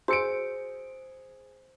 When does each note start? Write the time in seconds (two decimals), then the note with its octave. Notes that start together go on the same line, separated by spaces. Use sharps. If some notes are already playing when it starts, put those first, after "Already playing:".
0.08 F#4 G#4 C5 E6 C#7 D7